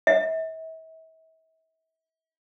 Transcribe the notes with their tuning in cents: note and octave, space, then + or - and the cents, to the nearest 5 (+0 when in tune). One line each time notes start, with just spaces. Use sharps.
E5 -40